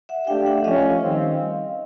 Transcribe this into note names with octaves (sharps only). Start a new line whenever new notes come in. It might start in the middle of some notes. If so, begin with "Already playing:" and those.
E5 F#5
A3 D4 G4 F5 G5
E5 F#5
F3 A3 C#4 D#5 F5
D#3 G3 C4